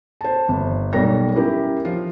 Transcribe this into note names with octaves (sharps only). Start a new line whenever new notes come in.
C5 A5
G1
B1 G3 A#3 A#4 C#5 A#6
C#4 E4 G4 A#4
F3 F4